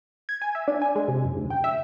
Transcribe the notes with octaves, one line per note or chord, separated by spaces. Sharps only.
G#6
G#5
E5
D4
G#5
G#3
C3
F#2
D2
G5
E5